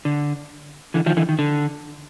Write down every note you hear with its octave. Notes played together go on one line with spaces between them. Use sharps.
D3
D3 E3
D#3 F3
D3 E3
D#3
D3